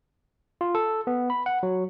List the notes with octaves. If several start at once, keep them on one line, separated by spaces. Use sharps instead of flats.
F4
A4
B3
B5
F#5
F#3